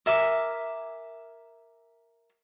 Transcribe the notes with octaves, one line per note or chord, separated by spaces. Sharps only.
A#4 E5 G#5 D6